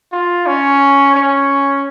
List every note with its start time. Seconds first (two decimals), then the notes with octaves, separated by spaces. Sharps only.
0.12 F4
0.46 C#4
1.15 C#4